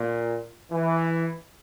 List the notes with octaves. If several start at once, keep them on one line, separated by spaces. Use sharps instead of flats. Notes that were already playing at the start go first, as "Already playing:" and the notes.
Already playing: A#2
E3